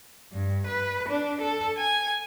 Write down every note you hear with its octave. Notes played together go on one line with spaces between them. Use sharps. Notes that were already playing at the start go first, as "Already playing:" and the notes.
G2
B4
D4
A4
G#5